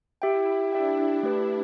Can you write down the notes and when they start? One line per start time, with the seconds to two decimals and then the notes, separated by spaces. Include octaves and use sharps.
0.22 E4 G4 E5 G5
0.72 D4 G4 E5 G5
1.23 A3 G4 B4